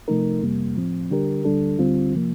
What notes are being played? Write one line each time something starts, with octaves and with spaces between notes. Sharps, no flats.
C3 F3 A3 D#4 A#4
F2 C3 G3 A#3
A2 F3 C4
D3 G3 D4 G4 A#4
D2 D3 G3 D4 A4
D2 D3 G3 C4 F4
C3 F3 A#3